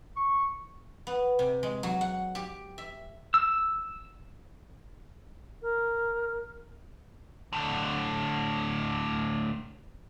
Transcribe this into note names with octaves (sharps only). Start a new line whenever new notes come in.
C#6
B3
C3
G#3
F#3
F#5
G4
E5
E6
A#4
A2 D3